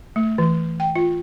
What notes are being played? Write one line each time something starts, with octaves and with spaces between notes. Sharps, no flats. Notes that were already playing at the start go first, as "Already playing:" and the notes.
A3
E3
G5
F4